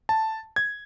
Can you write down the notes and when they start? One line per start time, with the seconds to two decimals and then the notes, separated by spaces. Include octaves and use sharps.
0.09 A5
0.56 G#6